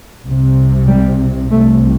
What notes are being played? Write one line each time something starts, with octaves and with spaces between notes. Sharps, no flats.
C2 C3
G3
C2 C3 A3